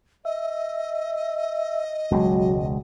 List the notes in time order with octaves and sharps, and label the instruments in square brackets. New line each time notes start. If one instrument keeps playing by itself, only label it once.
[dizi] D#5 [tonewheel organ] E5
[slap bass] E1 C#2 G#3 [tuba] F#3